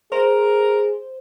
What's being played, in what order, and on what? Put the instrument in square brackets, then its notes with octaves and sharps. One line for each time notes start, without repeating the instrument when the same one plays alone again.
[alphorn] G#4 [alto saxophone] A#4 [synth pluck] C5